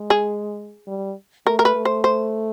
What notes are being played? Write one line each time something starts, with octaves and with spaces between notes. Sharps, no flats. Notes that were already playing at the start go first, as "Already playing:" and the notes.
Already playing: G#3
G#4
G3
A3 A#4
A#4
B4
A3
C5
C5